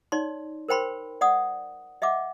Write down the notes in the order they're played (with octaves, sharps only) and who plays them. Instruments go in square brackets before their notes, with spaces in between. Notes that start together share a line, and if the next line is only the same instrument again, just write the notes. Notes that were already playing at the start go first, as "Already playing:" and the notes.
[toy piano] D#4 C#5 D5 C6
A#4 C5 G5 B5 C6
D5 F#5 D#6
D#5 E5 F#5 D6